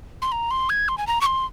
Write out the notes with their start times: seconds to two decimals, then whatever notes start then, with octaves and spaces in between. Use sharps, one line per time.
0.22 C6
0.32 A#5
0.51 C6
0.70 G#6
0.88 C6
0.98 G#5
1.07 A#5
1.21 C#6
1.26 C6